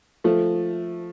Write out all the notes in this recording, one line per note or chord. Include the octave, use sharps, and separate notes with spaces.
F3 A3